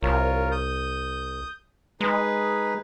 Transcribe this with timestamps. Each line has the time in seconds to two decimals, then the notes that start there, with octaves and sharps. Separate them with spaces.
0.03 C2 F4 A#4 C#5
0.51 D#6 G6
2.01 G#3 D#4 G#4 B4